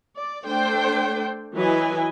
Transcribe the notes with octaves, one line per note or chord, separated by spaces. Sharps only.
D5
A3 D4 A4 C5 G5
E3 F#3 E4 B4 D#5 G#5